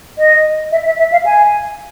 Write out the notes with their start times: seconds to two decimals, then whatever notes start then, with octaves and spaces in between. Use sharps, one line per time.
0.18 D#5
0.72 E5
0.86 E5
0.99 E5
1.12 F5
1.26 G#5